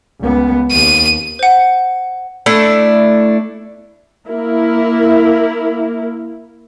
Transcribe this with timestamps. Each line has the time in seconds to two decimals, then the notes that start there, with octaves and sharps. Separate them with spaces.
0.21 C#2 B3
0.72 D#2 D#7
1.39 C5 F#5
2.46 A3 D4 E4
4.27 A#3 E4 A#4